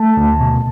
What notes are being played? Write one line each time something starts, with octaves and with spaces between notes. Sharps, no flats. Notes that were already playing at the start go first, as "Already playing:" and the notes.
Already playing: A3 A5
D2
B2